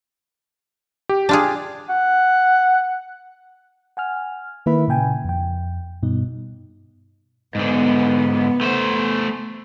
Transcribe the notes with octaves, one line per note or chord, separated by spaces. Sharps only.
G4
D4 F4 G#4
F#5
F#5 G#5 F6
D#3 A#3 E4 B4 E5 B5
A#2 C#3 G5 G#5
F2 G5
G2 B2 D#4
G#2 D3 B3
A3 C5